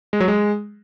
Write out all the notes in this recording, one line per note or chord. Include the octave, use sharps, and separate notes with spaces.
G#3
F#3
G#3